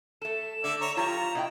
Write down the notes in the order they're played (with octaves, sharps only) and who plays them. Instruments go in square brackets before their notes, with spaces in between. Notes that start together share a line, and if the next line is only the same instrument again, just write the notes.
[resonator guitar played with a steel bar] A3 A4 [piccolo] E7
[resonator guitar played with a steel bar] D3 A3 [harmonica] D5 E5
[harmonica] C#5 A#5
[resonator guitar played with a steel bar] F3 G4 C#5 [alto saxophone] F4 [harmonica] A#5
[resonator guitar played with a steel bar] B2 E4 G5